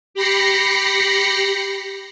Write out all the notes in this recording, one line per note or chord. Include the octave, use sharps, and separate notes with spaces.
G4 B5 A#6 C7 C#7